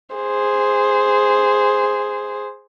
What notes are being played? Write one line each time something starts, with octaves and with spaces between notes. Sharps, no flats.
G#4 C5